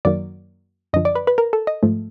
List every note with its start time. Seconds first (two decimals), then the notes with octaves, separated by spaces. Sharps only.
0.05 F#2 D#3 F#3 A#3 D5
0.93 F#2 D3 F3 D#5
1.05 D5
1.15 B4
1.27 B4
1.38 A#4
1.53 A4
1.67 D#5
1.83 G#2 F3 A3